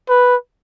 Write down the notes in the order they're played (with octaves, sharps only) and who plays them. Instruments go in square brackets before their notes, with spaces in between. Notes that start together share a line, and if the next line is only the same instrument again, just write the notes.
[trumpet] B4